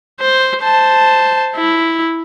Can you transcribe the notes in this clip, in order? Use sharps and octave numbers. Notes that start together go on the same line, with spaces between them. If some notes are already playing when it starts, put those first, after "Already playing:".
C5
C5 A5
E4